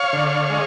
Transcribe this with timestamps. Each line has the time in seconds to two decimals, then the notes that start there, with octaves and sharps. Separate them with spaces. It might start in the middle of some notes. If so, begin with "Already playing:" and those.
Already playing: C#5 F5
0.13 D3
0.50 G#3